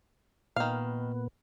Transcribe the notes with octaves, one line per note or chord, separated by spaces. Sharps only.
A#2 D#3 B3 F5